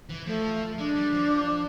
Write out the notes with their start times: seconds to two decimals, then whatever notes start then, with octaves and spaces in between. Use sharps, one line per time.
0.09 E3
0.26 F3 A3
0.78 G#3 D4
0.95 G3
1.12 F3